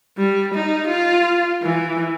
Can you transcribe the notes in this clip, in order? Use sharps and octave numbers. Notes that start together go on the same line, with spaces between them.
G3
D#4
F4
E3